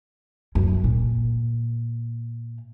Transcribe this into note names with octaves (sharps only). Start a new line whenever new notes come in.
F#2
A#2